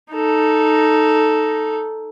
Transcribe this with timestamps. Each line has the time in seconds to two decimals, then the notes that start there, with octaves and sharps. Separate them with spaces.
0.12 D#4 A4